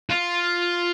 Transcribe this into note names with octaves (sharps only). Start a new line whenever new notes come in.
F4